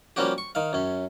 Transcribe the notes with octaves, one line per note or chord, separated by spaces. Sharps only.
F3 G3 A#3 C#4 F#4 G4
C#6
D#3 F5
F#2 C#4